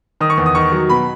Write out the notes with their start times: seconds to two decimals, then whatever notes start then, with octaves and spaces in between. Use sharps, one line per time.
0.20 D#3 D#6
0.30 C#6
0.38 E2
0.46 D#6
0.55 D#3 C#6
0.72 F#3
0.90 B2 B5